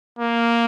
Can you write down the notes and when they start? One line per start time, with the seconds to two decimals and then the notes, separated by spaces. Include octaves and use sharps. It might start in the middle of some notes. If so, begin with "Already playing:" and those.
0.19 A#3